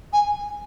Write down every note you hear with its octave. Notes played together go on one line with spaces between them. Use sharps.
G#5